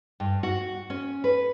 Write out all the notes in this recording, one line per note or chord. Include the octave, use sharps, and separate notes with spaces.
G2
F#4
C#4
B4